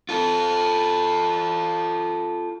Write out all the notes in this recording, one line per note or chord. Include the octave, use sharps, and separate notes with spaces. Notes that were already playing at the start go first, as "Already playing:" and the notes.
F4 A4